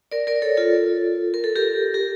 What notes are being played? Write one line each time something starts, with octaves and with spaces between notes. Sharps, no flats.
A#4 D5
A#4 D5
A4 C#5
F4 A4
A#4
A4
G4 A#4
G4 A#4